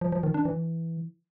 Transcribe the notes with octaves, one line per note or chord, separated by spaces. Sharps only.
F3
F3
D#3
D4
E3